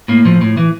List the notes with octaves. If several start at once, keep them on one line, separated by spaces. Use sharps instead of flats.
A2 A#3
A2 F3
A2
E3